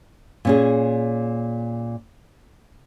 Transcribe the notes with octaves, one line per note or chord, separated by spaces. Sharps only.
A#2 C#4 G#4